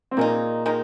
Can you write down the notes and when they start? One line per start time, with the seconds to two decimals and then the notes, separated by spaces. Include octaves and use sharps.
0.11 C4
0.17 A#2 D#3 G#3 A#3 D#4
0.66 D#3 G#3 D#4